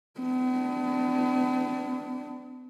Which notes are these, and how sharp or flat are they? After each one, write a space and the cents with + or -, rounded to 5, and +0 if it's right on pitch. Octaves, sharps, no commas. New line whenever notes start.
B3 +45 D4 +0